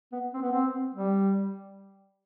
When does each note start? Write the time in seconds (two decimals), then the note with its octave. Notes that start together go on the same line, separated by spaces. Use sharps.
0.12 B3
0.34 C4
0.42 B3
0.52 C4
0.95 G3